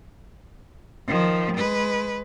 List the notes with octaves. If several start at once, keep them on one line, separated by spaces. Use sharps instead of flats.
D#3 F3
G#3 B4